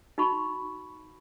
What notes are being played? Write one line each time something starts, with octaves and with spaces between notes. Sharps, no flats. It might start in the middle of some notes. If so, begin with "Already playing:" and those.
D#4 F#4 B5 C#6